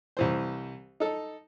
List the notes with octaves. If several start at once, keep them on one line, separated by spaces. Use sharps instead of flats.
C2 E3 C5
D#4 A4